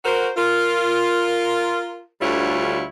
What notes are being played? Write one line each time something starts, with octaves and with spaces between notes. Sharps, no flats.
F#4 A#4 C5
F4 A#4
D2 D3 G3 E4 F4 C#5